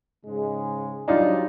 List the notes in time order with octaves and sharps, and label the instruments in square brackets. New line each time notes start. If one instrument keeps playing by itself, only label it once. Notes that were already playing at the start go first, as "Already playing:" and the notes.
[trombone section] G#2 C#3 G#3
[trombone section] F#3 G3 [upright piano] D4 D#4 F4